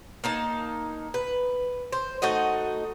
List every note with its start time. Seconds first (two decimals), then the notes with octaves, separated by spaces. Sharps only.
0.24 A#3 D#4 A5
1.14 B4
1.92 C5
2.22 A3 D#4 F#4 D#5